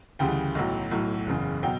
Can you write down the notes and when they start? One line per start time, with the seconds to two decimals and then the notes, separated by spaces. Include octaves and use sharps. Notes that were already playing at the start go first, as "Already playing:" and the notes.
0.19 D2 C#3 E3 G3 G5
0.55 B1 A2 F#3
0.91 B1 A2 F#3
1.27 F#1 E2 C#3
1.63 B2 F#3 G5